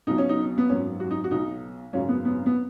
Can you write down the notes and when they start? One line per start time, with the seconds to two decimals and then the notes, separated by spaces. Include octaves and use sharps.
0.07 B1 B2 F#3 D#4
0.18 C#4
0.29 D#4
0.58 B3
0.69 G#1 F#2 F#3 C#4
1.00 F#4
1.11 D#4
1.24 F#4
1.31 B1 B2 F#3 D#4
1.93 G#1 F#2 C#3 F#3 C#4
2.09 B3
2.25 B3
2.46 B3